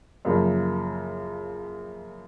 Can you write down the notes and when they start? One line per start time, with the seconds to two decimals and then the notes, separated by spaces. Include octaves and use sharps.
0.25 F#2 C#3 F3 A#3